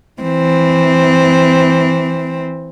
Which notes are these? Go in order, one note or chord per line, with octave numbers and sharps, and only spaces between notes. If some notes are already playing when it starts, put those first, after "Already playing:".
E3 C4